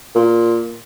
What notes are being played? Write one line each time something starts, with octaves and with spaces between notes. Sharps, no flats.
A#2